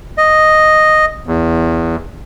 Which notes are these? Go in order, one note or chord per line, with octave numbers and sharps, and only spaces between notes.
D#5
E2